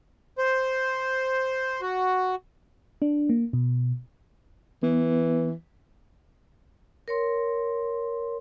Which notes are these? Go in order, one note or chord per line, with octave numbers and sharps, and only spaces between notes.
C5
F#4
D4
A#3
B2
E3 B3
A#4 C#5 C6